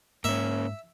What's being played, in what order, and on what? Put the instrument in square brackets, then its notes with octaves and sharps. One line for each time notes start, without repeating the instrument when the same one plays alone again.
[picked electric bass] G#2 [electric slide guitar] A#3 C#4 [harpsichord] E5